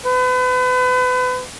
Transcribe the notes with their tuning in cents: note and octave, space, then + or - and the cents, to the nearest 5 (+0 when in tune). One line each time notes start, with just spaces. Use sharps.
B4 +35